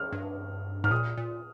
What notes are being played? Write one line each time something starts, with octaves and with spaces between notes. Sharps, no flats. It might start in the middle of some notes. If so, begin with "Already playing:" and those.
Already playing: F6
G2
G#2 F6
A#2 D#6
A#2